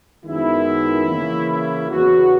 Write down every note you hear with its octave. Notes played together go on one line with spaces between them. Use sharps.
F#2 D#3 G#3 B3 E4
C#3 E3 A#3 C#4
E4
E2 C#3 F#3 B3 F#4